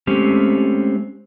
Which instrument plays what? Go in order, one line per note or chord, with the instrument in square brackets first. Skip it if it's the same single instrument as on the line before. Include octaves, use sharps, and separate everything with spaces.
[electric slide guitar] G#3 A3 C4 C#4 G4